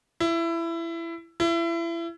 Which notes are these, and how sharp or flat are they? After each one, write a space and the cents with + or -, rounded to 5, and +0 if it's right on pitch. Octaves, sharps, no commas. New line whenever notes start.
E4 +20
E4 +30